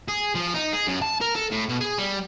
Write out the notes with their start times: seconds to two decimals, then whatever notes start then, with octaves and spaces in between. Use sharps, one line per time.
0.08 G#4
0.35 F3
0.54 D#4
0.73 G#4
0.88 F#2
1.02 A5
1.21 A#4
1.35 A4
1.51 A2
1.69 B2
1.81 G#4
1.98 G3